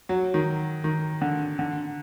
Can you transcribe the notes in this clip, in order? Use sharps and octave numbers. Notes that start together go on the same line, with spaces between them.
F#3
D#3
D#3
D3
D3